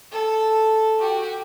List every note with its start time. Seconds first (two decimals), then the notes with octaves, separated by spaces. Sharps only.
0.12 A4
0.99 F#4 G4